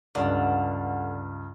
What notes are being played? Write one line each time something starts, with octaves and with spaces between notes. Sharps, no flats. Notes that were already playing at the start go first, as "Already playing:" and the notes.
C#2 G2 D3